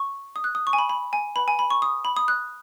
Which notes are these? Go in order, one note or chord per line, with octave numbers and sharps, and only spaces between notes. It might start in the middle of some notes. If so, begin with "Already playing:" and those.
Already playing: C#6
D#6
F#6
D#6
C#6
G#5
B5
B5
G#5
B4 F#5 B5
G#5
B5
C#6
D#6
B5
D#6
F#6